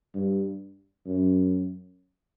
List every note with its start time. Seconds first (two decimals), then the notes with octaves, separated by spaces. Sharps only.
0.14 G2
1.06 F#2